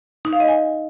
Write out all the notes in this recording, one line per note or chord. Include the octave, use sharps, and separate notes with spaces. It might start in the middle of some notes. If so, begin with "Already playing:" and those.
D#4
F5
D#5
G#5